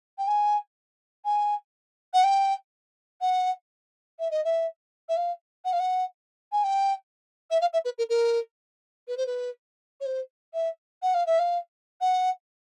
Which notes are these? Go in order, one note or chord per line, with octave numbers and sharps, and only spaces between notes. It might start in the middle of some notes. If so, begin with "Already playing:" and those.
G5
G#5
G#5
F#5
G5
F#5
E5
D#5
E5
E5
F5
F#5
F5
F#5
G#5
G5
E5
F5
E5
B4
A#4
A#4
B4
C5
B4
C#5
C5
E5
F#5
F5
E5
F5
F#5